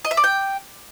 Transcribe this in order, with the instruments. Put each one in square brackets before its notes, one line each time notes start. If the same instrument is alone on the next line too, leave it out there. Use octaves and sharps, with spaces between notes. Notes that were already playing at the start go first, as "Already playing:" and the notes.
[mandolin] D#5
E5
D5
G5